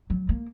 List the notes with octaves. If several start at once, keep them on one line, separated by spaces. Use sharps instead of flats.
F#3
A#3